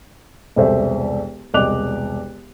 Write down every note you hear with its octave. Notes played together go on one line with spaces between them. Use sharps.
E1 C2 A4 C5 E5
E1 C2 D#5 D6 F#6 F7